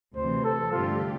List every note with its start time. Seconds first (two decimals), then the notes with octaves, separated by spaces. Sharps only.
0.15 D2 C3 E3 C5
0.44 A4
0.72 G2 D3 A3 C4 F4 G4